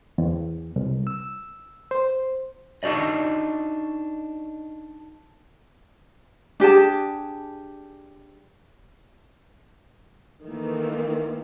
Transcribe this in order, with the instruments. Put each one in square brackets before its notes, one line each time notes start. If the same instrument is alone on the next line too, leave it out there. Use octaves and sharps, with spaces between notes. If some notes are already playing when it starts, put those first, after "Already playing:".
[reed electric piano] E2
C2
E6
C5
[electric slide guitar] D4 D#4 F#4 D5 D#5
[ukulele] D4 G4 G#4 A5
[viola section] D#3 E3 A3 A#3